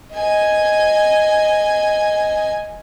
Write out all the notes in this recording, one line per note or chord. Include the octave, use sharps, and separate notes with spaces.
D#5 G#5